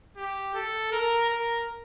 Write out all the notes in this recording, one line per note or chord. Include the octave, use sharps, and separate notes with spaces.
G4
A4
A#4
A#4